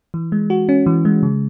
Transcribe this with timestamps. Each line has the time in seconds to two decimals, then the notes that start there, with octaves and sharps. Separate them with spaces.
0.14 E3
0.32 G#3
0.50 F#4
0.69 C#4
0.86 E3
1.05 G#3
1.23 C#3